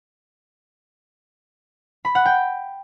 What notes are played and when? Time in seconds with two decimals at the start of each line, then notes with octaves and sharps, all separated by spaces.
2.05 B5
2.15 F#5
2.26 G5